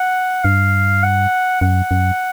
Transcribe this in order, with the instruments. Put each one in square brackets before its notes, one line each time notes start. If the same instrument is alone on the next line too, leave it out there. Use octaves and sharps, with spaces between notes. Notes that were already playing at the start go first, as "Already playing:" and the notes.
Already playing: [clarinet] F#5
[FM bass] G2 [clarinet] F5
[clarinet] F#5
[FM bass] F#2 [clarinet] F#5
[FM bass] F#2